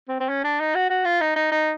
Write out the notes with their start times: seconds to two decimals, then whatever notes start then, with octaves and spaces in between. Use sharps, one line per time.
0.08 C4
0.20 C4
0.29 C#4
0.44 D4
0.60 D#4
0.75 F#4
0.90 F#4
1.05 F4
1.21 D#4
1.36 D#4
1.51 D#4